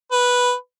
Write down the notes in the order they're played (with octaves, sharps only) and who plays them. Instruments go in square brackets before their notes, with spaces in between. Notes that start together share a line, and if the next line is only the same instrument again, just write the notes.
[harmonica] B4